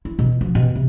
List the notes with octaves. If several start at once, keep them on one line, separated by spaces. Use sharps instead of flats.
E4
B2
F3
B2
C3